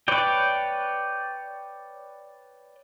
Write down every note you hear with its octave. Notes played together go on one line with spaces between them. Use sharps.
B4 C#5 D5 G5